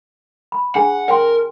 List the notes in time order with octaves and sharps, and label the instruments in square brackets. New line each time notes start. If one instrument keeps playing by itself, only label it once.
[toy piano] B5
[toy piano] D4 G#4 G#5 [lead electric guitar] F#5
[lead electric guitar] A#4 [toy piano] C#5 G5 C6